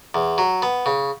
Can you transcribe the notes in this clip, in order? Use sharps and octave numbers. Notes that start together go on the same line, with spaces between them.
E2
F#3
B3
C#3